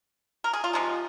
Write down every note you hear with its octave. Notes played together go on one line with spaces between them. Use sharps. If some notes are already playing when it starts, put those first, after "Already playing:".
A#4
G#4
F4
C3 F3 G#3 D#4